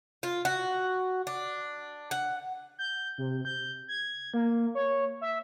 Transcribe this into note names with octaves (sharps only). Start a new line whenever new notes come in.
F4
F#4
D4
F#5
G6
C3
G6
G#6
A#3
C#5
E5